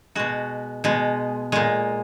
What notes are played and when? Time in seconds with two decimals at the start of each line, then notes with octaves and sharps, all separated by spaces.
0.15 B2 G#3 F#4
0.84 B2 G#3
1.52 A#2 G#3